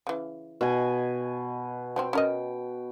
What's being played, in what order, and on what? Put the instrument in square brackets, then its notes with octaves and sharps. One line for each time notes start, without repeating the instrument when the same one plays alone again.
[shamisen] C#3 E3
[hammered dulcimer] B2 G#5
[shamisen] F3 F#3 C4 [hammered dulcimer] G5
[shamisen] C#4 A#4 D#5